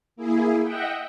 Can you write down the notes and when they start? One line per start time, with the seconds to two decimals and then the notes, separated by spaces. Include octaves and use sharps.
0.16 A#3 E4 G#4
0.63 D#5 E5 F#5 G5